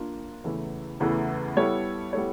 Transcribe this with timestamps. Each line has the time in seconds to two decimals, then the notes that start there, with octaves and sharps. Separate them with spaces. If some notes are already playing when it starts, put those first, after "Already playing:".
Already playing: A#3 D4 F4
0.44 E2 C#3 E3 A3
1.00 E2 C#3 E3 A3
1.56 G3 B3 E4 A4 C#5
2.13 G3 B3 E4 A4 C#5